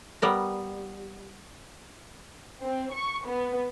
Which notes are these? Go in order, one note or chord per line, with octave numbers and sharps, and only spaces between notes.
G3 B3 A#4
C4
C#6
B3